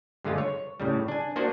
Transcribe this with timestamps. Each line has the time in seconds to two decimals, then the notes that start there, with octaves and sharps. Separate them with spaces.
0.24 G2 D3 G#3 A3 F4
0.38 C#5
0.80 A2 C#3 G3
1.08 D4 G#5
1.36 A#3 D4 F4 F#4 C5 F#5